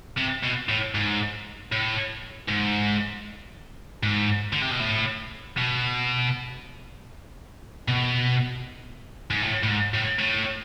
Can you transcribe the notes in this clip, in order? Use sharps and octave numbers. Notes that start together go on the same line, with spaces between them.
C3
B2
A2
G#2
A2
G#2
G#2
D3
C3
B2
A2
B2
B2
G#2
A2
A2
G#2
A2
A2